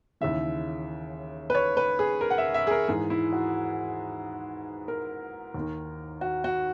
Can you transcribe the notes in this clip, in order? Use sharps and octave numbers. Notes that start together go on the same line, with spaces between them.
D#2 C#3 E3 E5
B4
C#5
B4
G#4
A#4
F#5
E5
E5
G#4
A#4
G#2 E3 G#4
E4
F#4
A#4
D#2
D#3
F#4
F#4